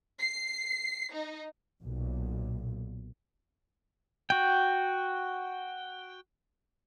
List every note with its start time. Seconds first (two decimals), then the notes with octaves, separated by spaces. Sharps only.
0.19 C7
1.11 D#4
1.81 B1 A#2
4.30 F#4 G5